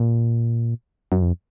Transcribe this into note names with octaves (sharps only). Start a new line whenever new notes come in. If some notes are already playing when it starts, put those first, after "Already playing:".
Already playing: A#2
F#2
F2